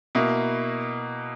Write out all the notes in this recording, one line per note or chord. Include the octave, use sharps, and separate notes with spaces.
B2 A#3 E4